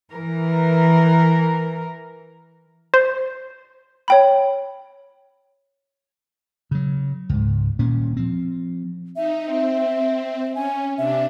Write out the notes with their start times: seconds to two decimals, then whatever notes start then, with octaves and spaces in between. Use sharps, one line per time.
0.11 E3 A#4
2.94 C5
4.08 C#5 G5 B5
6.71 C#3 F#3
7.29 C#2 G#2
7.79 D#1 A#2 C#4
8.17 F3 C4
9.16 D#4 E5
9.45 C4
10.55 C#4 G#5
10.97 C3 D4 E5